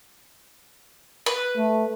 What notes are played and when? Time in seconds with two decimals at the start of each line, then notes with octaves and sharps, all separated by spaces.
1.26 B4
1.56 A3